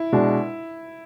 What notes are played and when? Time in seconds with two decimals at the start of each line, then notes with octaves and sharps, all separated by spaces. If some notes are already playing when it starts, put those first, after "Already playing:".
Already playing: E4
0.12 B2 G#3 D4